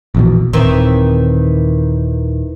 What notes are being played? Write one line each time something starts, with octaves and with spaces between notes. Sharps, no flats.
A#1 E2 B2
D#1 D#3 E3 C4